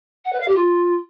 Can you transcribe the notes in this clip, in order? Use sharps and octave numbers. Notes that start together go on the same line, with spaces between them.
F#5
B4
F5
G4
F4